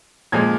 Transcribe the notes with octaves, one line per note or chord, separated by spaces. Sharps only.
A#2 F3 G#3 G#6